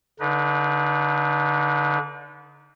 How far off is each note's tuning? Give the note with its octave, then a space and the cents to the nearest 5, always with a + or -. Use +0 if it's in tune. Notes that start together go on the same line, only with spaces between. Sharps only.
D3 -30 D#4 +0 B4 -30